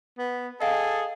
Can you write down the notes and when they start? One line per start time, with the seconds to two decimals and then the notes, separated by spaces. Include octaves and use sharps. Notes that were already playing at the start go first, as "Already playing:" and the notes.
0.18 B3
0.61 G#4 A4 D#5 F5 G5